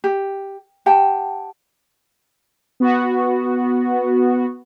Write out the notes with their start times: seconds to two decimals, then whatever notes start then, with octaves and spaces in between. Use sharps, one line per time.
0.04 G4
0.86 G4 F#5 G5 A5
2.80 B3 F#4